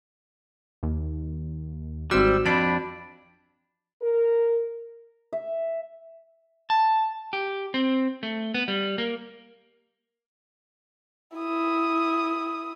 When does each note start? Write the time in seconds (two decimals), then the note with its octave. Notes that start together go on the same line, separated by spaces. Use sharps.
0.83 D#2
2.11 G#1 G3 C4 F#4 E6
2.46 F2 D4 B5
4.02 A#4
5.33 E5
6.70 A5
7.33 G4
7.74 C4
8.23 A3
8.54 B3
8.68 G3
8.98 A#3
11.37 E4 D#6